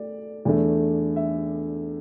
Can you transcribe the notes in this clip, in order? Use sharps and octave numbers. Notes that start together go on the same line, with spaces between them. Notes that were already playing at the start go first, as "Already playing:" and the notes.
Already playing: A3 D5
E2 D3 A3
E5